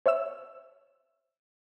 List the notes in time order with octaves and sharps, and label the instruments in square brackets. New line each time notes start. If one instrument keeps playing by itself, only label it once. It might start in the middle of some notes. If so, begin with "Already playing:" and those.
[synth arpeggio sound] C5 C#5 E5 E6 E7